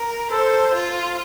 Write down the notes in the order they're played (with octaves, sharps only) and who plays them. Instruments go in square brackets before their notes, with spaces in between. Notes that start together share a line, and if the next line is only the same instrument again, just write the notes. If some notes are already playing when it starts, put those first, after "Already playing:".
Already playing: [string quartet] A#4
[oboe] A4 [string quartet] C5
[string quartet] F4